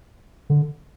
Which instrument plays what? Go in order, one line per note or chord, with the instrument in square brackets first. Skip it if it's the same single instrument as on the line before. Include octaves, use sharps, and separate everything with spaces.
[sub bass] D3